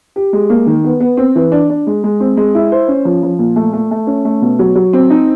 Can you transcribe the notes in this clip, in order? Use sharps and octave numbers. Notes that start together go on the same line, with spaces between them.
G4
G#3
A#3
D#3
B3
B3
C4
E3
D4
D4
G#3
G#3
C4
G#3
E4
C5
C#4
F3
F3
A#2
A3
A3
A3
C#4
A3
B2
F#3
F#3
C4
D#4